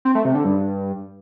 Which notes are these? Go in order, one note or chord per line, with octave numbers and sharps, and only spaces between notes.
C4
A3
C3
D3
G2